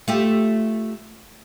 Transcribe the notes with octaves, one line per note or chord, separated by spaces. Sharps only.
A3 F4 G4